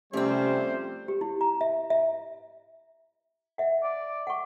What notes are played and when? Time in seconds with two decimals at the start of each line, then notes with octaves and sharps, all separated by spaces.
0.13 C3 F3 G3 A3 C4 C#4 C5
1.08 G4
1.21 E4
1.41 A#5
1.61 E5
1.90 E5
3.58 E5 F#5
3.83 D5
4.27 F#5 C#6